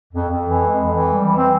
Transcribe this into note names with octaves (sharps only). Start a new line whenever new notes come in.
F2
F2
E3
G#3
F2
E3
G3
E3
C4